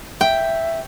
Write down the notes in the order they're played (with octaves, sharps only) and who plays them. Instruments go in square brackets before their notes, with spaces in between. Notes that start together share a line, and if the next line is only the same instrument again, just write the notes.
[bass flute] E5 [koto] G5